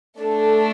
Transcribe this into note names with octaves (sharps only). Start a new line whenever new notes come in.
A3 D4 A4